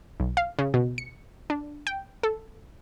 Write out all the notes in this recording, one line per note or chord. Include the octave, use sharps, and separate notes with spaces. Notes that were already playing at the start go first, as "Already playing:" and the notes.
B1
F5
C#3
B2
C#7
D4
G5
A4